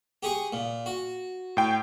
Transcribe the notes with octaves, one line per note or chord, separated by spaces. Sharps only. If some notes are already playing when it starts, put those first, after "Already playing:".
G4 G#4 C#6
A#2
F#4
A2 G5